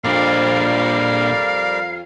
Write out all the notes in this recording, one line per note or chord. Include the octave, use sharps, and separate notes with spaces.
F2 A#2 G3 D4 A#4 D5 F5